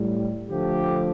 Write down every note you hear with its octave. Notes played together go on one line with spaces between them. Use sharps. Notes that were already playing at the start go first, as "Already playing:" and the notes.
Already playing: A2 G3
D3 F3 A3 G4